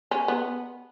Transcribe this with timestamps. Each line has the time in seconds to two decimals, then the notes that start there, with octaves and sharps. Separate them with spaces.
0.11 C#4
0.28 B3